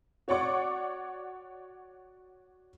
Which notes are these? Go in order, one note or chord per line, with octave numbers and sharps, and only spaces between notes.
F#4 C#5 D5 F#5 C#6 D6